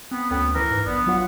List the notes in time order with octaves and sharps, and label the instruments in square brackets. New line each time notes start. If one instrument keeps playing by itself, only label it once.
[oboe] B3 [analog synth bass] C4
[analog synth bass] D2 [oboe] B3 [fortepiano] C#4 A4 G5
[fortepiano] E3 B4 E6 [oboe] A#4
[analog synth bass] G#2
[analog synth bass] A#1 [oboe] B3 [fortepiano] D4
[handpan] F#3 F4 F#5